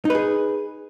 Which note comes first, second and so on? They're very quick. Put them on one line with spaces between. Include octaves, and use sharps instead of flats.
D#4 B4 G#4